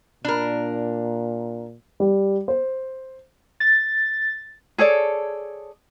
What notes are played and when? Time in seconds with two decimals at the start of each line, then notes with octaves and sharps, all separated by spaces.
0.25 A#2 D4 A#4
2.00 G3
2.48 C5
3.60 A6
4.78 G#4 A4 C#5 D5